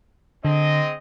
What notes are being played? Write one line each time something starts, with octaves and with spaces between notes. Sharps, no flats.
D3 G#3 C4 D#5